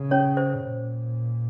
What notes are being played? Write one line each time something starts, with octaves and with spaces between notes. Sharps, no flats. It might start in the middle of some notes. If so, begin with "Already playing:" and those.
Already playing: C#3
C#4 C#5
C5
A#2